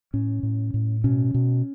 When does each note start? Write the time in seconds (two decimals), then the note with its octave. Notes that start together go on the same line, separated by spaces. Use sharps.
0.14 A2 C#4
0.43 A2
0.74 A2
1.04 B2 C#4
1.34 B2